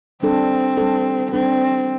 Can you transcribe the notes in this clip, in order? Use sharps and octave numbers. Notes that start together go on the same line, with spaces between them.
G3 C4 D4 A4
G3 D4 A4
G3 C4 D4 A4